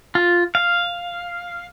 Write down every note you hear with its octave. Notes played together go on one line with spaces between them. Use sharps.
F4
F5